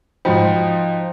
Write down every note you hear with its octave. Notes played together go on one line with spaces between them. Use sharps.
G#2 F3 D#4 F#4 C5 G5 B5